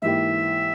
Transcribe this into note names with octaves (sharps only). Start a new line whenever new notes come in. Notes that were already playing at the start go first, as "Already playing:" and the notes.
G#2 E3 A#3 E4 G4 E5